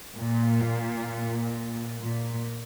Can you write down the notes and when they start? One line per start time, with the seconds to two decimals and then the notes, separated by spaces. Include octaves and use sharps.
0.16 A#2
1.98 A#2